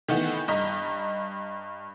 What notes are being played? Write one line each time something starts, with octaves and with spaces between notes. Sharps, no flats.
D#3 E3 A3 B3
G2 D#5 A#5 B6